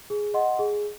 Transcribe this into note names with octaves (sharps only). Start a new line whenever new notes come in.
G#4
D#5 F#5 C6
G#4